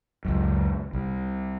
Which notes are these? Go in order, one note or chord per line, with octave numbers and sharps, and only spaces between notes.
C#2 F#2
C2